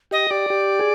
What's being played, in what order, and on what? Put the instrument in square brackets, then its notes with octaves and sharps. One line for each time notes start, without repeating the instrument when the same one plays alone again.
[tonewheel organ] G4 [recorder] D#5
[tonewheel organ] G4 [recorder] D5
[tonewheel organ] G4
G#4